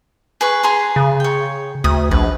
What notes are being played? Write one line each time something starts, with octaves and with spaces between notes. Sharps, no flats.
G#4 B4 C#6
G#4 A#5 C6
C#3
C#5 G5
D2 D#6
A#1 B4